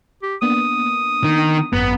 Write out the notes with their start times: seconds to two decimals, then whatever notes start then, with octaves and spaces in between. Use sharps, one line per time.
0.23 G4
0.42 A#3 B3 D4 D#6
1.24 D#3
1.73 G#1 F#2 B3 A#5